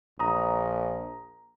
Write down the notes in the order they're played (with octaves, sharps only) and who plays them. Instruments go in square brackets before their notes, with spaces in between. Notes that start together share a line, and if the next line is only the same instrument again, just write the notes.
[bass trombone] A#1 [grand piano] A#5 D#6